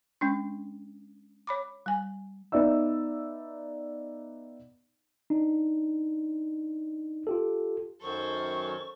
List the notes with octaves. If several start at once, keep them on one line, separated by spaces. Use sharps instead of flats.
G#3 C#4 D4
C#5 B5 D6
G3 G#5
B3 D#4 D5 E5 E6
D4 D#4
F4 G4 A4
F#2 D#3 F#3 A4 C5 C#6